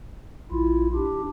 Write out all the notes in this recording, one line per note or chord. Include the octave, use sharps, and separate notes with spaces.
A#1 E4 F4
D4 G4